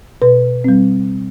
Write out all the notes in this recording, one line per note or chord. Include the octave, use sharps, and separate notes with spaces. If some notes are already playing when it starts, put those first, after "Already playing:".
B2 B4
G3 C4